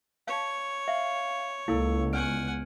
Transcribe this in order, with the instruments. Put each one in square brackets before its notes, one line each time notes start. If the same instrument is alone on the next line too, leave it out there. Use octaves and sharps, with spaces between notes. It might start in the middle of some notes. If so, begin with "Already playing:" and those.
[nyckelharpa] C#5 [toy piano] F5 A5
[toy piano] E5 [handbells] F5
[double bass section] C#2 [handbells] A#3 A4 [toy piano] E4
[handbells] B3 F6 D7 [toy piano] D5 [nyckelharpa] F#5 G#5